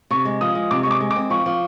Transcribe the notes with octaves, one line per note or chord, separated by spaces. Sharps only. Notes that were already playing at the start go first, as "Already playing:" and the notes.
C3 C#6
G#3
F3 D#6
G#3
C3 D6
G#3 C#6
D6
G#3
D6
C4
F3 C#6
F3